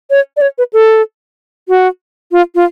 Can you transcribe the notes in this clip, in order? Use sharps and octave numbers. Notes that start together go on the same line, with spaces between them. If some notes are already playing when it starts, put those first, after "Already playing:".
C#5
D5
C#5
B4
A4
F#4
F4
F4